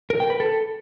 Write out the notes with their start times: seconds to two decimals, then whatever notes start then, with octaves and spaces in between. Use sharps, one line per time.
0.10 A#4
0.20 G5
0.30 B4
0.40 A4